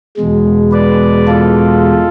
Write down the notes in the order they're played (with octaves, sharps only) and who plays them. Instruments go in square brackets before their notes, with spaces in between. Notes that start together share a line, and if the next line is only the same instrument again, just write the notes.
[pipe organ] E2 B2 G#3
B4 D5
F4 A4